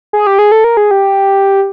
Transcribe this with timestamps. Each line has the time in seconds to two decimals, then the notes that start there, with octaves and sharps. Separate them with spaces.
0.13 G#4
0.27 G4
0.39 G#4
0.52 A4
0.64 A#4
0.77 G#4
0.91 G4